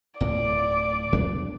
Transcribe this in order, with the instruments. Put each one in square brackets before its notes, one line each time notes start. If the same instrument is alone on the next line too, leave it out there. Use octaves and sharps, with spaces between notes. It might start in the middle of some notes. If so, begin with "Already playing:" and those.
[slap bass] D1 A2 [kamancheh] D5
[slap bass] E2 F#3 D4